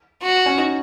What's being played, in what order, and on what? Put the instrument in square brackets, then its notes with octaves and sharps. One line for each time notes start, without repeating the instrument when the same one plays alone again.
[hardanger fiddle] F#4
[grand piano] C#4
D#4